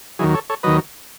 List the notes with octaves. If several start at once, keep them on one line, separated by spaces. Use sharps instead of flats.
D#2 D#3 F#3 E4 G#4
A4 C#5
A4 C#5
D#2 D#3 F#3 B4 D#5